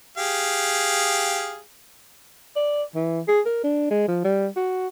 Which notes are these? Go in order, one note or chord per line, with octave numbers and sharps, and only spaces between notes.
G4 G#4 F5
D5
E3
G#4
A#4
D4
G#3
F3
G3
F#4